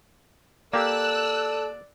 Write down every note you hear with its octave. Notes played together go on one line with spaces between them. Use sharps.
A#3 G4 A4 D5 E6 F#6